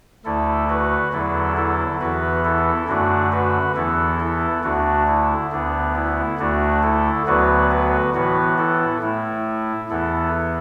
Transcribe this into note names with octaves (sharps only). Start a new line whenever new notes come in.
D2 D3 A3 E4 A4
F#4 B4
E2 D3 F#3 E4 A4
E4 A4
E2 E3 B3 F#4 B4
E4 A4
F#2 D3 A3 D4 F#4
F#4 B4
E2 E3 B3 E4 A4
E4 A4
D2 D3 A3 D4 F#4
E4
D2 D3 B3 D4
E4
D2 D3 A3 D4 F#4
E4 A4
D2 D3 F#3 B3 F#4 B4
F#4 B4
A2 E3 B3 F#4 B4
E4 A4
A2 A3 E4
E2 E3 B3 E4 A4